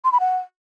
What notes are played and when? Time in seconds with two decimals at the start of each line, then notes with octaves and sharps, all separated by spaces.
0.04 C6
0.12 B5
0.20 F#5